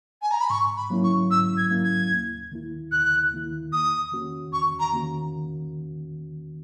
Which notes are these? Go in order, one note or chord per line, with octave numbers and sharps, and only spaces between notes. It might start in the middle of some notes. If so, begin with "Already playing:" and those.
G#5
A#5
B5
G#2 C#6
B5
F#3 A#3 C#4 E4
C#6
G#2 E6
G#6
F#3 A#3 C#4 E4
G#6
D#2
D#3 A#3 E4
D#2 F#6
D#3 A#3 E4
E2 D#6
D#3 A#3 C#4 F#4
E2 C#6
A#5
D#3 A#3 C#4 F#4